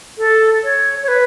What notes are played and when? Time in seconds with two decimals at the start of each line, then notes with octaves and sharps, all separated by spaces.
0.18 A4
0.64 C#5
1.03 C#5
1.08 B4